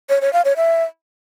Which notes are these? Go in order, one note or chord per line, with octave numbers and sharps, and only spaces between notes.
C#5
C#5
F5
C#5
E5